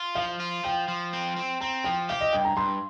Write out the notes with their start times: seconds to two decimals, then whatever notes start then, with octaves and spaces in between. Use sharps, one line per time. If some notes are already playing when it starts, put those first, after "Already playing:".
Already playing: F4
0.15 F3 F5
0.40 F4
0.64 F3 G5
0.88 F3
1.13 C4
1.37 C4
1.61 C4 A#5
1.84 F3 G5
2.09 G4 F5
2.21 D#5
2.33 G2 G5
2.45 A#5
2.57 G2 C6